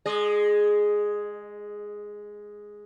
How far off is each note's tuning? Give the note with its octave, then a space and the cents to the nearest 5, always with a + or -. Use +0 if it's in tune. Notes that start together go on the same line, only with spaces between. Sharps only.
G#3 +0 D#5 -30